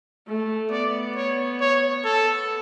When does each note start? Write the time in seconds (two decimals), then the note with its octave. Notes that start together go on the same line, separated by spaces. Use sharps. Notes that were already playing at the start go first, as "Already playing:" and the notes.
0.27 A3
0.71 B3 D5
1.16 C#5
1.61 C#5
2.05 B3 A4